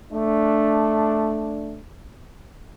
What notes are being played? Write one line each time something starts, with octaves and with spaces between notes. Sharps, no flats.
A3 D4